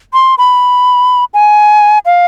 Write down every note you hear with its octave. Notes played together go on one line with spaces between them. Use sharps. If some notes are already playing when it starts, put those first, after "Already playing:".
C6
B5
G#5
F5